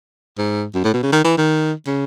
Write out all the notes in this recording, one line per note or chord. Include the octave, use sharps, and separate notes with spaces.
G#2
F#2
A2
B2
C#3
D#3
E3
D#3
C#3